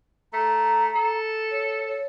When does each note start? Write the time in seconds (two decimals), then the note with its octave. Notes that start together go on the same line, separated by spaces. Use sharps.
0.33 A3 A#5
0.95 A4
1.52 C#5
1.88 C#5